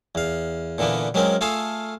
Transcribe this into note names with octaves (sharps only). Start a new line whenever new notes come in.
E2 F5
A#2 D3 E3 A#3 B3
F#3 G#3 A#3 C4 C#4 A#4
A3 F4 G#4 A4 F5